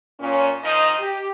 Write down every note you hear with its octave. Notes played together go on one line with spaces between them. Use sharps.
A#2 C#4
D#3 F3 D#4 D#5
G4